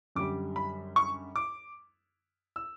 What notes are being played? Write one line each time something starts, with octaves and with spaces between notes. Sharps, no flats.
F#2 D3 G3 D6
B5
C#6
D6
E6